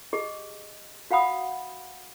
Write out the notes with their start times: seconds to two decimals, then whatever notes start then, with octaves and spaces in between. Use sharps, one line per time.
0.13 G4 G#4 D#5
1.11 F#4 F5 F#5 B5 D#6